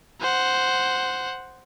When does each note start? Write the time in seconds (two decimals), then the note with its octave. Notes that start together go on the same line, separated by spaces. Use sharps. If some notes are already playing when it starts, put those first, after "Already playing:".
0.21 C5 F#5